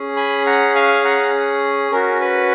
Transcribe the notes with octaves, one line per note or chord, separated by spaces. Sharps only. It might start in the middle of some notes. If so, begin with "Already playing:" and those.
Already playing: C#4 G#4
G#5 B5
F#5 A#5
F5 G#5
F#5 A#5
C#4 F#4 A#4
B4